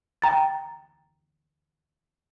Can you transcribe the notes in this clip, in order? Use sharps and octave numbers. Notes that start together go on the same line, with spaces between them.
G5 A#5 A6